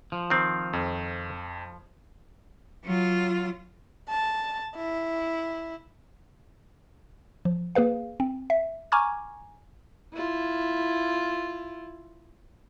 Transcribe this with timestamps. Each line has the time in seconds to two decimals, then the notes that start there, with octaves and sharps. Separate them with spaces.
0.12 F3
0.30 D#3 C4
0.73 F2
2.84 F#3 F4
4.09 A5
4.76 E4
7.45 F3
7.75 A#3 G#4 B4 F5
8.20 C4
8.50 E5
8.92 G#5 A#5 C#6 D6 F6 G#6
10.14 E4 F4